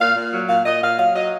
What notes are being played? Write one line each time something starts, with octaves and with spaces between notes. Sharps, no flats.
A#2 F5
A#2
F#3
A#2 F5
A#2 D#5
A#2 F5
F#3 F5
F#3 D#5